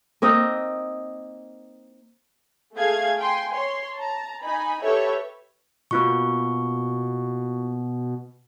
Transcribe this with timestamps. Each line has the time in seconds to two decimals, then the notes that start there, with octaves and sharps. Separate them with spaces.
0.22 A#3 C4 D#4
2.76 A3 G#4 F5 G#6
3.19 G5 G#5 C6
3.53 C#5 C6
3.96 A5 A#5
4.42 D#4 G#5 B5
4.83 G4 A4 B4 C#5 E5
5.91 B2 A#3 F4 C#6